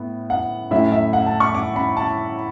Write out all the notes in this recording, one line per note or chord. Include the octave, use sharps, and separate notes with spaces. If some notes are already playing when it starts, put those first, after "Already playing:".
Already playing: A2 B3
F#5
A2 F#3 C#4 E4 E5
E5
F#5
A5
C#6
D6
B5
A5